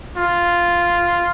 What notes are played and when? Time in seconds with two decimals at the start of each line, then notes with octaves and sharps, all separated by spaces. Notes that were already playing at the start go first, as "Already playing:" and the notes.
0.17 F4